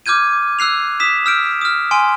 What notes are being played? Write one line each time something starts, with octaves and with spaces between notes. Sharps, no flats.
D6 F6 G6 G#6 D#7
E6 F#6 C7 F7
D#6 B6 E7
E6 F6 G6 D7
D#6 F6
G#5 C6 D7